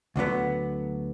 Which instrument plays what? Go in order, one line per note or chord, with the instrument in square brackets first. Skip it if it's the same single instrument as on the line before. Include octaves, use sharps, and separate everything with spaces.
[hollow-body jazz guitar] D2 D3 F#3 B3